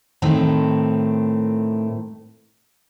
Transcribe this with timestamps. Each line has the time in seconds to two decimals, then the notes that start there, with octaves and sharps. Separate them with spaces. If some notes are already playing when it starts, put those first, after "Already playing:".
0.22 A2 D#3 A3 C4